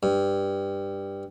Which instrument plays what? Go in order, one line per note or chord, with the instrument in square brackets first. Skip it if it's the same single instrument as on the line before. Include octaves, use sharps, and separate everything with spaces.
[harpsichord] G2